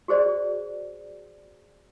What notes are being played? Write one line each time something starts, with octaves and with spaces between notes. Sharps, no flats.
F#4 G#4 C5 D5